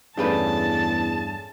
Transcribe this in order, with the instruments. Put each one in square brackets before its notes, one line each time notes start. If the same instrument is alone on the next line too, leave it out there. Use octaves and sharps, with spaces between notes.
[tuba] E2 [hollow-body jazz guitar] G2 G4 B4 [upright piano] A3 C#4 G#4 [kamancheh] A5